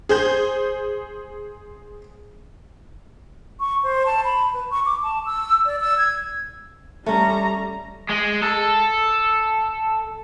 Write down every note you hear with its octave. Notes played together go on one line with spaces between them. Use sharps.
G#4 C5 G6
C#6
C5
A5
B5
B4
C#6
D6
A5
E6
D5
E6
G#6
G3 A3 C#4 A#5
G#3
A4